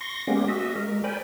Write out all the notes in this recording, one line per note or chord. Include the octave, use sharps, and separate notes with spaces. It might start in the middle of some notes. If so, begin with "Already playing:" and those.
C6 C#6 A#6
G#3 A#3 B3 C#4 G4
F#4 D#5 E5
G#3 A#4
A#4 C5 D5 G5 G#5 B5